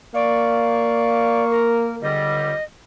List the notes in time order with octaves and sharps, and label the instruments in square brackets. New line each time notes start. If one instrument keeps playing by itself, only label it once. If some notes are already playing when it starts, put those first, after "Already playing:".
[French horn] A#3 [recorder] D5 [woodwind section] F5 C#6
[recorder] A#4
[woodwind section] C#2 D3 G3 [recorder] D#5